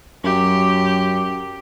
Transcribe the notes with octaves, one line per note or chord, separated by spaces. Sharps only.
F#2 G4